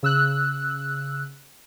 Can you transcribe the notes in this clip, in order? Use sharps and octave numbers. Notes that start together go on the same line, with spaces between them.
C#3 E6 F#6